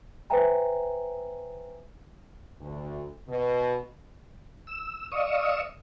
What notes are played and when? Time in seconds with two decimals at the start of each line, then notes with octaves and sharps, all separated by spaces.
0.30 B4 C5 E5 G5 G#5 A#5
2.61 D2
3.29 B2
4.67 E6
5.12 D5 D#5 F5 C#6 D#6 E6